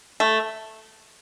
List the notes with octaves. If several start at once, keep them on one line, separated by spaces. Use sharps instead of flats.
A3